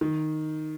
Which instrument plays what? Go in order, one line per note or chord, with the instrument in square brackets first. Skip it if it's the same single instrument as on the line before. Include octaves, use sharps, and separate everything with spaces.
[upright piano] D#3